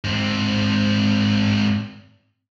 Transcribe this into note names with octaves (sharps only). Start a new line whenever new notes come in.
G#2 C4